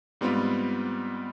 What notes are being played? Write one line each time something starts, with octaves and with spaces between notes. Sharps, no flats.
G#2 G3 B3 C4 F4